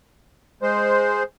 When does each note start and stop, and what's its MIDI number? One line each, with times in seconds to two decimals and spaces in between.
0.62 1.23 56
0.62 1.23 72